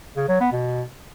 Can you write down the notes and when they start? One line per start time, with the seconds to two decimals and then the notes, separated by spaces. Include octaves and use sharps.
0.16 C#3
0.28 F#3
0.40 B3
0.52 B2